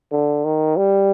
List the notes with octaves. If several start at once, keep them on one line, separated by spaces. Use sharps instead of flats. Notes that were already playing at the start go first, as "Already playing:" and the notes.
D3
D#3
G3